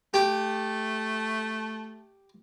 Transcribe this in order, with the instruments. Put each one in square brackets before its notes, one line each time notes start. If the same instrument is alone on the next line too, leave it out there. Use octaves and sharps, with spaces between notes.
[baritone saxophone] A3 [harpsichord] G4